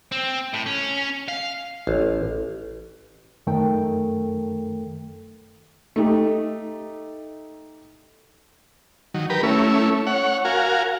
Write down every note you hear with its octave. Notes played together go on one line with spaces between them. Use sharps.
C4
A2
C#4
F5
A1
F#2 D#3 A3 A4 A#4 G5
A3 D#4 G4
D#3 F#3
G4 A#4 B4
A3 C#4 E4
C#5 F#5
F#4 A#4 F5 G#5